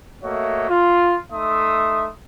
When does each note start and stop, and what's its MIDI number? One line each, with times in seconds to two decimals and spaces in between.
0.24 0.68 57
0.24 0.68 58
0.24 0.68 66
0.24 0.68 73
0.24 0.68 75
0.24 0.68 76
0.70 1.16 65
1.32 2.08 57
1.32 2.08 63
1.32 2.08 76
1.32 2.08 84
1.32 2.08 87